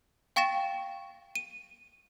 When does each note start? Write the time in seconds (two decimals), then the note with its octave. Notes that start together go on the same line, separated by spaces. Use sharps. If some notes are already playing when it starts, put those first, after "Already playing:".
0.36 F5 G5 C#6 A6 A#6 E7
1.35 D#7